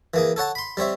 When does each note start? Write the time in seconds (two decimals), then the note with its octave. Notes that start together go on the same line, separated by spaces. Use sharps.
0.14 E3 A#3 G#4
0.36 A4 C#5 F#5 A5
0.55 B5 C6
0.77 G3 C4 C#5 E5